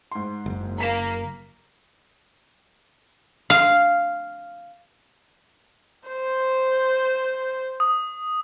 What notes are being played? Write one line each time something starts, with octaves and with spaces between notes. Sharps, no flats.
G#2 C6
F#1
A#3 A#5 B6 E7
F5
C5
D#6